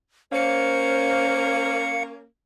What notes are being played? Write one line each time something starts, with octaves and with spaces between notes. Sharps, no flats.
A#3 C#4 C5 F5 C#7